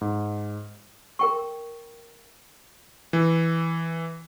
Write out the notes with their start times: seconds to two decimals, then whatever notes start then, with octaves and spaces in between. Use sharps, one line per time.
0.01 G#2
1.19 A#4 G5 C#6
3.13 E3